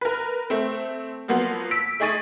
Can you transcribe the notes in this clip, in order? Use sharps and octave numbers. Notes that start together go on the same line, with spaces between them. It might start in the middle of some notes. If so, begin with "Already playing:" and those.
A#4 B4
A3 C4
F3 F#3 A#3 B3 F4
E6 B6 D7
A3 D#4 G#4 C#6 A6 D#7